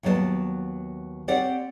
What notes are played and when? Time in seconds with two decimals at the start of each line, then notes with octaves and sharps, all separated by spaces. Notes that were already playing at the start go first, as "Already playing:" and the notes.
0.03 D#2 F#3 B3 D5 A5
1.28 C4 G4 C#5 D5 F#5